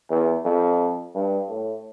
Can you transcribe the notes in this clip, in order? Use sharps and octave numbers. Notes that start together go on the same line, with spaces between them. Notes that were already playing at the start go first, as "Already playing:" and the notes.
E2
F2
G2
A2